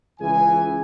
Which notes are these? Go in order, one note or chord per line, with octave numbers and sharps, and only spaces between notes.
C#2 E3 G#4 G#5